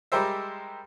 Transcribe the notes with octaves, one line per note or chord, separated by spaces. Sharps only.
G3 G#3 G4 A#4 C5 E5